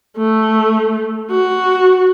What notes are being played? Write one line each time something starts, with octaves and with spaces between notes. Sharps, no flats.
A3
F#4